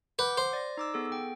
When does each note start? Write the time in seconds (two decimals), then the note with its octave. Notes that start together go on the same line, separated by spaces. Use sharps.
0.19 B4 F#5 D6 G6
0.37 C5
0.53 D5 A#6
0.77 D#4 D6 E6
0.94 B3 G#4 A4
1.12 G5